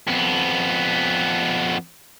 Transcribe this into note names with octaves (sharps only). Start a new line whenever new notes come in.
F2 B3